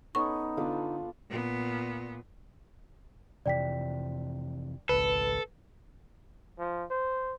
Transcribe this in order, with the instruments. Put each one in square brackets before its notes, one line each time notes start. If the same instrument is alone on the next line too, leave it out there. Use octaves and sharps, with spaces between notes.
[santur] B3 C#4 A4 [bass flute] D#4 [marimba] C#6
[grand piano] D3 B3 [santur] D4 F4
[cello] A#2 B3
[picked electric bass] F2 C3 E3 [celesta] D5 G5 B6
[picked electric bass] G#1 C#2 [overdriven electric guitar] A4 [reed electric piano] B4
[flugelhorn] F3
C5